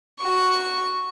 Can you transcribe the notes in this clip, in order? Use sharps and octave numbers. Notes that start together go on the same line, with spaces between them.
F#4 C#6